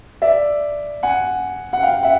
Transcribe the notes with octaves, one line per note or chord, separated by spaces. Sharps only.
D5 E5
F#5 G#5
F#5
F5 G5
E5 F#5